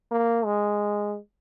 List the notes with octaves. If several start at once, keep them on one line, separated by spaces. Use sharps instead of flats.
A#3
G#3